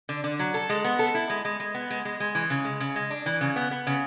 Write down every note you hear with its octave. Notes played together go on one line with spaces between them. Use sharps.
D3
D3
F#3
A4
G#3
B3
A4
E4
G#3
G#3
G#3
B3
G#3
G#3
G#3
E3
C#3
G#3
C#3
G#3
D4
E3
C#3
B3
B3
C#3